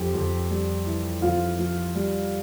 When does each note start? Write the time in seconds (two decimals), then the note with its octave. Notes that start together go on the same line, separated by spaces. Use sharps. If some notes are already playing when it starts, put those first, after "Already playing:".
Already playing: F2 G4
0.14 F2
0.50 G3
0.86 E3
1.22 F2 F4 F5
1.58 F3
1.94 G3